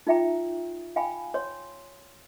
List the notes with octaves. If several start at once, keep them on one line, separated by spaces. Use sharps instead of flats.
D#4 F4 E5 G5 A#5
F5 G5 G#5 B5
C#5 C6